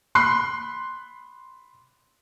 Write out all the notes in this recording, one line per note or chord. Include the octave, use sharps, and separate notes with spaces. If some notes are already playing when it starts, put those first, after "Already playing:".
B5 C6 F#6 C7